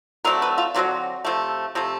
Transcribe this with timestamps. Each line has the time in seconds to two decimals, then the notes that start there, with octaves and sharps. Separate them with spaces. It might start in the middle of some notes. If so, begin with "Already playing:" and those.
0.25 D3 F#3 A3 C4 A#4
0.42 B4
0.58 F4
0.74 D3 F#3 A3 C4 F#4
1.25 C3 F3 A3
1.75 C3 F3 A3